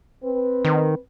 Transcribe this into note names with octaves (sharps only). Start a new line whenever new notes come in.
C4 B4
D#3